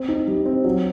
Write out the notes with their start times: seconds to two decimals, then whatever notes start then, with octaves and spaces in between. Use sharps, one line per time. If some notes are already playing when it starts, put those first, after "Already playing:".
Already playing: C4
0.08 D#4
0.28 G3
0.46 C4
0.64 F#3